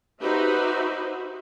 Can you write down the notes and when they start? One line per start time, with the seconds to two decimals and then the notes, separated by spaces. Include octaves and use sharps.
0.21 D#4 F#4 G4 B4 C5 E5